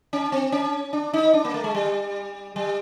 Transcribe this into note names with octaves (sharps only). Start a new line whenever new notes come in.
C#4
C4
C#4
D4
D#4
D4
A#3
A3
G#3
G3
G3